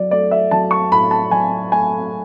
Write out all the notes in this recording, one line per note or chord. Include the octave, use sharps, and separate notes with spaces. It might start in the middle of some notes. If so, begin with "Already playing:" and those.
Already playing: F#3 D5
A3 D5
E5
F#3 A5
C#6
A2 B5
A5
F#3 G#5
A3 G#5